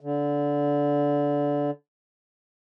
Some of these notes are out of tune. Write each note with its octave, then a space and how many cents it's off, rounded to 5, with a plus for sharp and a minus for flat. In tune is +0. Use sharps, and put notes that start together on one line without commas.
D3 -20